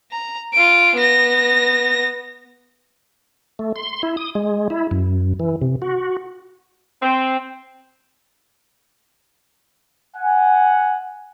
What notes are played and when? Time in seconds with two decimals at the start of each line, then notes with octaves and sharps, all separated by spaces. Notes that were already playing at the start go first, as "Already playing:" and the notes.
0.12 A#5
0.53 F4 D7
0.96 B3 A#6
3.59 A3
3.76 C6
4.03 E4
4.17 D#6
4.35 G#3
4.70 E4
4.91 F#2
5.40 E3
5.62 C3
5.82 F#4
7.01 C4
10.16 F#5 G#5